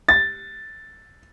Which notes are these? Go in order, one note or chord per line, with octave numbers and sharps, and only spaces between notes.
A6